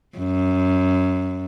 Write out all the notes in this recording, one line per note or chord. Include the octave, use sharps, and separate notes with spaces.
F#2